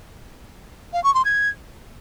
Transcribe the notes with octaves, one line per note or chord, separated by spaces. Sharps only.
F5
C#6
C6
G#6